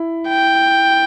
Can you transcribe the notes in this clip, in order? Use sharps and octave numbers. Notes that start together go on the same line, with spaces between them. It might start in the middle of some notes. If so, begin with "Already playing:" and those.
Already playing: E4
G5